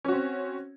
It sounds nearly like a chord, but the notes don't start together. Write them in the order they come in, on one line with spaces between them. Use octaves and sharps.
C#4 F#4 C4